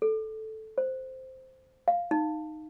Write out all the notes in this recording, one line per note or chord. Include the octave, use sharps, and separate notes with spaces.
A4
C5
F5
D#4